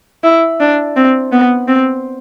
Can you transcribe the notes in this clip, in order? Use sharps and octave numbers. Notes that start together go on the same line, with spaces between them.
E4
D4
C4
B3
C4